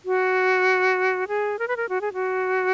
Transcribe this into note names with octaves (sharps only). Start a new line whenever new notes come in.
F#4
G#4
A#4
B4
A#4
F#4
G#4
F#4